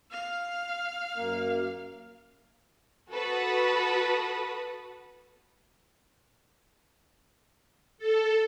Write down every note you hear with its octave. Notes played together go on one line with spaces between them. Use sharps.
F5
F#2 A#3 A#4
F#4 A4 B4 D#6
A4